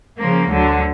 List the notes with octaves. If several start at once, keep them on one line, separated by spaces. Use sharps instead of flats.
C#3 F3 A#3
D2 D3 F#3